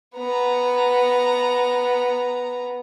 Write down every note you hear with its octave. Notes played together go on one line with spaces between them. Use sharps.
B3 A#5